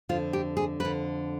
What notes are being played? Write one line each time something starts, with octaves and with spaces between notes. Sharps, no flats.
F2 D3 F4
G4
G#4
F2 D3 B4